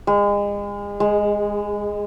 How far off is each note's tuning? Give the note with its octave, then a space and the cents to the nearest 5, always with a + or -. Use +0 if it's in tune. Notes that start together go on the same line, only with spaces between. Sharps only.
G#3 -35
G#3 -5